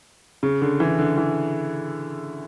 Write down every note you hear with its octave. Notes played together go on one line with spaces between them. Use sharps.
C#3
D3
E3
D3
E3